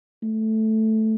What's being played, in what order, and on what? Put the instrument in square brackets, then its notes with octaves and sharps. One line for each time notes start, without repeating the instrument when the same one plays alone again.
[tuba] A3